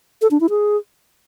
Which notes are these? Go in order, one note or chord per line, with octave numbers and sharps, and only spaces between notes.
A4
D4
E4
G#4